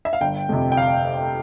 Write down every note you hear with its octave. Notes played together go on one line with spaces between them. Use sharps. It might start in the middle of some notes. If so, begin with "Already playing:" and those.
E5
F5
G1 G5
F2 C3
G5
F5